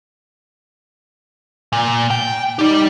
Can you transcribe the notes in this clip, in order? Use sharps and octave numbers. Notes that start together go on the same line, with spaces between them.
A#2
G5
D#4 G4 D5